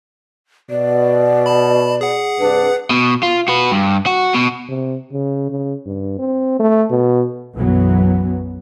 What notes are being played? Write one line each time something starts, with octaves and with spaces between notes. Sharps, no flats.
B2 D5
A5 B5
G#4 F#5
G2 C3 D4 B4
B2
F4
F#4 B4
G2
F#4
B2
C3
C#3
C#3
G2
C4
A3
B2
B1 F#2 E3 F#3 B3